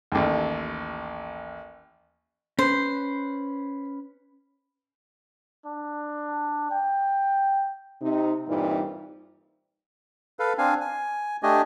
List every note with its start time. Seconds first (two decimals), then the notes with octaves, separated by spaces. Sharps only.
0.12 A1 D#2
2.59 C#4 B4 C5
5.66 D4
6.71 G5
8.02 C3 D#4
8.48 G2 A#2 E3 G3 C4 D#4
10.39 A4 B4 F5
10.58 C4 D4 F5 G#5
10.81 G#5
11.43 A3 D4 G4 D#5 G#5